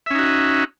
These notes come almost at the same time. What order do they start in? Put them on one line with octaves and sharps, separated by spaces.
E5 C#4 D#4 F#4